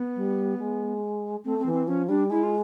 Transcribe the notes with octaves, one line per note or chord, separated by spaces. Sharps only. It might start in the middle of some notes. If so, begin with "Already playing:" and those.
Already playing: B3
G3
G#3
A3 C4
C4
E3
C4
F3 C#4
G3 D4
G#3 E4
F4